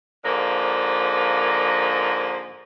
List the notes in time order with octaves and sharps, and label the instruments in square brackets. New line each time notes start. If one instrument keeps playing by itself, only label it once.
[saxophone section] G#2 D3 F3 A#3